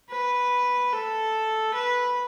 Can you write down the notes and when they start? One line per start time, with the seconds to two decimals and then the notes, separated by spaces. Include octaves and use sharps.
0.10 B4
0.92 A4
1.74 B4